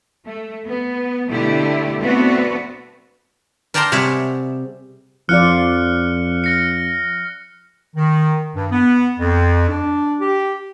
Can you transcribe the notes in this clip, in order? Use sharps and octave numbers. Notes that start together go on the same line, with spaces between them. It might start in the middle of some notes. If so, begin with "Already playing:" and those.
A3
B3
B2 D3 A3 E4 G4
A3 B3 C4 D4 F#4 B4
A#4 D5 G5 A5 A#5 C6
C3 G3 G#4 C#5 E5 F#5
F2 F3 F4 D5 F6 F#6 C#7
F6 A#6 C#7
D#3
G2
B3
F2
D4
G4